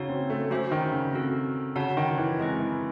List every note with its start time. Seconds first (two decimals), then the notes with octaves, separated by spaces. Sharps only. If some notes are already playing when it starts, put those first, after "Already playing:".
Already playing: C#3 D#4 F#4 C#5
0.09 C4
0.30 A3
0.50 F#3 A3 C#4 F#4 C5 E5
0.72 D#3
0.92 C#3
1.13 C4 F#4 A4
1.76 C#3 F#4 C#5 F#5 A5
1.97 D#3
2.17 E3
2.39 G#3 C4 D#4 G#4 D#5
2.60 E3